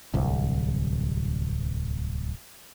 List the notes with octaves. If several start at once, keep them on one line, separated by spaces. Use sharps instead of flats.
D1 C2